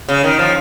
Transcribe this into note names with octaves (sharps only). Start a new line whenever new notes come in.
C#3
D#3
F3